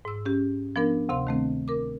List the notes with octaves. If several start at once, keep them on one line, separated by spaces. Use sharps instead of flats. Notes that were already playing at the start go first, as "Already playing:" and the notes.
G#2 E6
C#4 G4
F3 B3 D4 A#4
D2 C3 F5 C6
D#3 A3 C4
A#4 D6